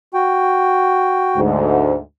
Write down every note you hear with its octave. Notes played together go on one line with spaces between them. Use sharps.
F#4 G5
D2 G#2